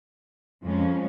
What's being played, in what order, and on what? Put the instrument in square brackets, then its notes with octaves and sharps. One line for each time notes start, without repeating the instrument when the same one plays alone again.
[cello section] F2 F3 G#3 C#4